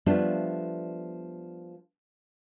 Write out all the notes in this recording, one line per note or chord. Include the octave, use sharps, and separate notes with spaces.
F3 G3 A3 B3 D4 F4